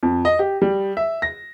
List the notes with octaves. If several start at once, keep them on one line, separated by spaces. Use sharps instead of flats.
F2
D#5
G4
G3
E5
A#6